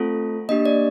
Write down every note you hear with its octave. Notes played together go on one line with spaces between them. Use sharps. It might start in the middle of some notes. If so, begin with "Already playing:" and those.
Already playing: A3 C4 F4 A4
A#3 D4 G4 D#5
D5